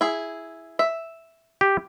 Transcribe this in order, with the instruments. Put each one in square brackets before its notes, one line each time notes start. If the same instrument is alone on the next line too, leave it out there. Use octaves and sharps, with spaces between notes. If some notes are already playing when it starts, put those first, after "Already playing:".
[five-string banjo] E4 G#4
E5
[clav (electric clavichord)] G4